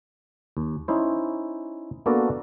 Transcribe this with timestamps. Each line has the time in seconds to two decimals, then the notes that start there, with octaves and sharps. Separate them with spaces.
0.57 D#2
0.88 C#4 D#4 E4 C5
2.06 A#3 B3 D4 F#4 A4 A#4